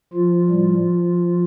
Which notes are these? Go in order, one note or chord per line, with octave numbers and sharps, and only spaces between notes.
F3 F4
A2 G3